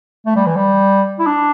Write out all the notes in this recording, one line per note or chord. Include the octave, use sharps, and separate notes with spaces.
A3
G3
E3
G3
E4
D4